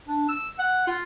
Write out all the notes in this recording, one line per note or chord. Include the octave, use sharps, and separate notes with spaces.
D4
E6
F#5
F4